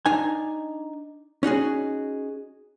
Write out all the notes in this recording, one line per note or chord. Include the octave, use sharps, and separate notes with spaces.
D4 D#4 G#5
C#4 D#4 F#4 G#4